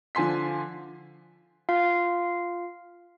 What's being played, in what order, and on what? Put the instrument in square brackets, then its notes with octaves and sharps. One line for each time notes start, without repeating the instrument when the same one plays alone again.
[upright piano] D3 F3 G#5 C6 B6
[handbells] F4 F5